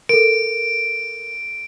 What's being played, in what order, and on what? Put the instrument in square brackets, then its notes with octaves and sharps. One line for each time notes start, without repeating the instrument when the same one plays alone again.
[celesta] A4 A#4 [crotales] D7